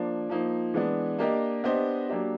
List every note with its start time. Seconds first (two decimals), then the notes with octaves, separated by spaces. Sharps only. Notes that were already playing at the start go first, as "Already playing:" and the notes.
Already playing: F3 A#3 D4
0.30 F3 A#3 D#4
0.74 E3 G#3 B3 D4
1.19 A#3 D4 G4 A#4 D#5
1.64 B3 D4 G4 C5 D#5
2.09 F#3 A#3 D4 G4